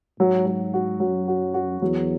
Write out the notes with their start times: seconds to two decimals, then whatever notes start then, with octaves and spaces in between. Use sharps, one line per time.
0.19 G#2 F#3
0.46 F#3
0.74 F#4
1.00 F#2 F#3
1.28 F#4
1.54 F#4
1.81 E2 F#3